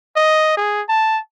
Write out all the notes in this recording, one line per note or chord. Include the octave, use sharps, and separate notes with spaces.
D#5
G#4
A5